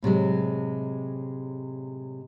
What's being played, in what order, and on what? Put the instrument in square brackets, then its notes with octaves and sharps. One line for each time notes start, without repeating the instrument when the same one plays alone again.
[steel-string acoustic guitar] A2 C3 F#3 G#3